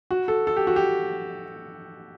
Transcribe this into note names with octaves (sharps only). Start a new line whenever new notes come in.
F#4
A4
A4
G4
F#4
G4